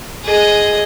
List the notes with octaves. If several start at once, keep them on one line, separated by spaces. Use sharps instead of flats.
G#4 D#5